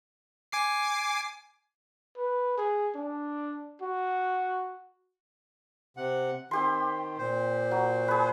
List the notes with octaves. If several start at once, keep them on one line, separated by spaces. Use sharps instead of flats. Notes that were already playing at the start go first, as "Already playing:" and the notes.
G#5 D6 C7
B4
G#4
D4
F#4
C3 F#5
D#3 C4 G4 C6
A#2 C5
F#3
G#4 B4